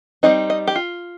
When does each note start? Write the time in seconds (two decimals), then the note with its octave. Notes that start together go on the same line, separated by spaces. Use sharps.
0.23 G3 C4 D#4 D#5
0.50 D#5
0.67 G4
0.75 F4